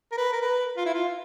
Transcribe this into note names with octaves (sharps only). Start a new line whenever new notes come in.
A#4
B4
A#4
B4
F4
E4
F4